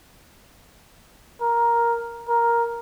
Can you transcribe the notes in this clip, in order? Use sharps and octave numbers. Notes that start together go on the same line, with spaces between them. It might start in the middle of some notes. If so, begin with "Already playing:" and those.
A#4
A#4